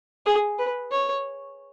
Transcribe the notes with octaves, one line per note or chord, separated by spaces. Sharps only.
G#4
B4
C#5